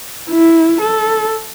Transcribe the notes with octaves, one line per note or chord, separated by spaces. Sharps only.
E4
A4